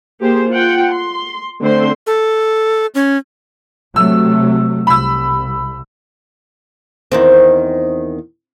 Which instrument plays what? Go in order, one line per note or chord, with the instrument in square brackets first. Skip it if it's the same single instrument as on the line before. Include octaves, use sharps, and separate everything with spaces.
[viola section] A#3 G4 G#4 C5
F4 F#5 G5
C6
D3 A3 C4 C5 C6
[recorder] A4
C#4
[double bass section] C3 F#3 A3 [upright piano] E6
[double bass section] C2 [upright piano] B5 E6
[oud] E2 D#3 C4